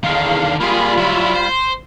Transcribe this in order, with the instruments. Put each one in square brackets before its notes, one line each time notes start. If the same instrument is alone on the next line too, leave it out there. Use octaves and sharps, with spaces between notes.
[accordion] E2 F5 [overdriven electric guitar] D3 D#3
[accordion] G3 F4 B5 [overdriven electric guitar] A#3 G#4
[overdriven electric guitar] F#3 E4
C5